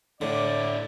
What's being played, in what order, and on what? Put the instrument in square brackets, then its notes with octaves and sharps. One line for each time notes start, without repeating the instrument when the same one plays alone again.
[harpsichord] A2 D3 [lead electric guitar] D4 E4 [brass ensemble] D5